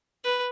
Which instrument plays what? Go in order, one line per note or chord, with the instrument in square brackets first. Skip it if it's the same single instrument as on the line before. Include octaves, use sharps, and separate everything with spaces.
[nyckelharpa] B4